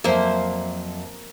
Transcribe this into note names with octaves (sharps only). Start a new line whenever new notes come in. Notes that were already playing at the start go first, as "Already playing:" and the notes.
F2 F#3 A#3 C5 E5